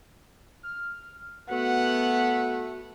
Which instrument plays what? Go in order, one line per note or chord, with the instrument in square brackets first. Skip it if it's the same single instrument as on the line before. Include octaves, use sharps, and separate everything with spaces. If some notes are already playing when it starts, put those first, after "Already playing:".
[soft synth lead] F6
[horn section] A3 [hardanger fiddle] B3 [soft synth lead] F#4 [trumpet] F#5